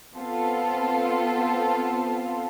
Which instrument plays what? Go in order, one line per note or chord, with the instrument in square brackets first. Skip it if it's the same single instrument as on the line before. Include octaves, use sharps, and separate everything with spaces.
[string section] B3 C4 F4 A4